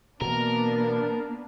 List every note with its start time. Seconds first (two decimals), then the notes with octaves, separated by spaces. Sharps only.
0.21 B2 E3 A#3 B3 D4 A#4